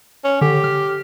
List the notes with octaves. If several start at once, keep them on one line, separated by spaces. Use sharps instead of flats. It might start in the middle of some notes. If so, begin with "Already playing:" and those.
C#4
D3 G4
F6